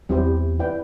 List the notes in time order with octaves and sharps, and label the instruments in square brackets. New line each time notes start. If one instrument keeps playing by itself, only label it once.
[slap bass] E2 [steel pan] G3 C4 E4 G4 C5
[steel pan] E4 B4 D5 G5